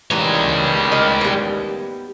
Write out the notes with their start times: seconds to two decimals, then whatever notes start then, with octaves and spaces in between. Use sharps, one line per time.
0.11 A1 D#2 E3 G3 G#3 C#5 A#5
0.92 A#4 D#5 G5
1.21 B3 G4